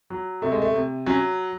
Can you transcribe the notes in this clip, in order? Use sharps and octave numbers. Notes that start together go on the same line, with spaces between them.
F#3
C3 A3
G#3
A3
C3
F#3 C#4